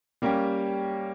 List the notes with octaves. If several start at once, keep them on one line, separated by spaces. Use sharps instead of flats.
G3 A#3 C#4 G4